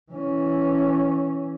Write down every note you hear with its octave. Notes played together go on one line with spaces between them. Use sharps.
E3 C#4